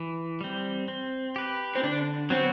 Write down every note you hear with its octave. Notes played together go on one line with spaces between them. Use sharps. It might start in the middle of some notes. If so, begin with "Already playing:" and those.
Already playing: E3
G3 C4
C4
G4 B4
C4
D3 D4
F#3 B3 C4 F#4